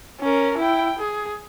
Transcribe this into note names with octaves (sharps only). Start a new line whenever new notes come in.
C#4 A#4
E4 G5
G#4